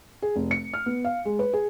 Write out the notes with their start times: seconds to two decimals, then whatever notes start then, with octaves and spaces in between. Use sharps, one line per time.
0.22 G#4
0.36 F1
0.51 C#7
0.74 F6
0.86 B3
1.05 F5
1.25 G#3
1.39 B4
1.53 G#4